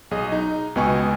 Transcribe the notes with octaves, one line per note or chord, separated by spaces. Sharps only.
B1 G#4 D#5
D#4
C#2 B2 B3 D#5 G#5 C#6